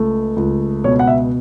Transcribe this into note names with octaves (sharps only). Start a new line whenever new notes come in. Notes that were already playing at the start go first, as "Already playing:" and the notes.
Already playing: C#2 A3
C#2
B2 C#5
F#5
E5